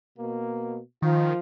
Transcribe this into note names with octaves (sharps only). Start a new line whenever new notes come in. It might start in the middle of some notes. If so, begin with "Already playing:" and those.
B2 A#3
D#3 F3 F4